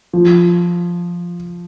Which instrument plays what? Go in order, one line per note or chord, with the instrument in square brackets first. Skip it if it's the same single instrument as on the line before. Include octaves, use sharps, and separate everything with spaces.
[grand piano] F3